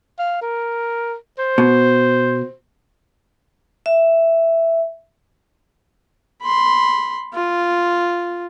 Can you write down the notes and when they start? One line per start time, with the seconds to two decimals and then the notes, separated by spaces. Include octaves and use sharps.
0.19 F5
0.42 A#4
1.39 C5
1.58 B2
3.86 E5
6.42 B5 C6
7.33 F4